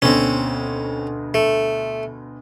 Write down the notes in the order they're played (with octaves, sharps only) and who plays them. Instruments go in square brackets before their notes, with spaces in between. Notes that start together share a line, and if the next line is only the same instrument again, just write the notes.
[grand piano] D2 B2 [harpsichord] C4 C#4
[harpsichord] A3